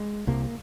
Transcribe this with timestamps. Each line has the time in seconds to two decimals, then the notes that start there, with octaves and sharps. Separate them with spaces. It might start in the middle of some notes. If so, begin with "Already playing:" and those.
Already playing: G#3
0.27 C2 C3 A#3